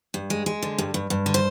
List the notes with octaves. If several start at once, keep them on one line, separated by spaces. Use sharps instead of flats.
G2
G#3
G#3
D3
G2
G2
G2
D3
C5